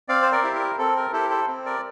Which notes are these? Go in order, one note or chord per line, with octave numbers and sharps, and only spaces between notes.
C4 D5 F5
C5
A#4 D5
E4 G4
A#4
C4 A4
A#4
E4 G4 A4 C5
A4 C5
C4
A#4 D5